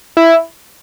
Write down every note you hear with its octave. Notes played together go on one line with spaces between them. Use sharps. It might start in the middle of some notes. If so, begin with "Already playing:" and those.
E4